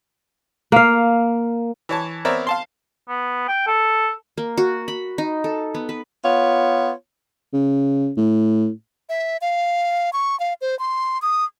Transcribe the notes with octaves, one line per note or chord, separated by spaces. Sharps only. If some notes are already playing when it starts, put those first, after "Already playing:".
A#3 F5
E3 C#5 A5
B3 C4 A#4 C#5 D5 E5
F5 A5 C6
B3
G5
A4
A#3
F#4
B5
D#4
A4
B3
B4
B3 F4 C#5
C#3
A2
E5
F5
C#6
F5
C5
C6
D#6